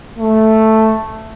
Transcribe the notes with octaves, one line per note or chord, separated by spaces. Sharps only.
A3